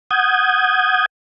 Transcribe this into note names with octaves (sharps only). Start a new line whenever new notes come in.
F#5 D#6 G6 G#6